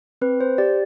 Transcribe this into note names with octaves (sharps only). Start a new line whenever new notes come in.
C4 B4
C5
G4 D5